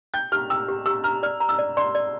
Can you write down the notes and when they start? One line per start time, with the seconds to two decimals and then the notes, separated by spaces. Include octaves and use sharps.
0.14 G5 G6
0.32 G4 F6
0.50 G5 E6
0.69 G4
0.86 G4 E6
1.04 A#5 F6
1.23 D5 F6
1.40 A#5
1.49 E6
1.59 D5
1.77 D5 C6
1.95 D5